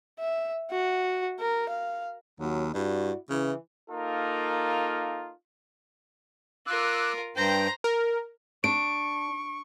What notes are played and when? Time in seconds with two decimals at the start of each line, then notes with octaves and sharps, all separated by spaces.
0.19 E5
0.71 F#4
1.40 A#4
1.69 F5
2.40 D#2 F#3
2.74 G2 E4 F#4 D5
3.30 C#3 E3
3.91 A#3 D#4 F4 A4 A#4
6.67 F4 A#4 D6 E6 F#6
7.36 G2 C5 G5 A#5
7.84 A#4
8.64 D4 C#6 D7